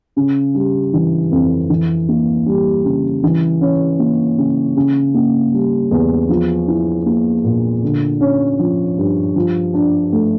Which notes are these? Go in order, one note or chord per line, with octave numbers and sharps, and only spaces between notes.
C#3
G3
E3
F2
E3
A#3
G3
C#3
E3
C#4
A#3
C#3
C#3
A#3
G3
E2
F3
E4
A#3
A#2
D3
C#4
F3
G2
F3
D4
A3